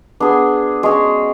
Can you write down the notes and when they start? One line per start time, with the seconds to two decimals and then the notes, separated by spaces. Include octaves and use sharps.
0.20 B3 D4 G#4
0.83 G#3 C#4 G#4